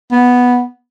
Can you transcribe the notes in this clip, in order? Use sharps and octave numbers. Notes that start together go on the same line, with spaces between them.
B3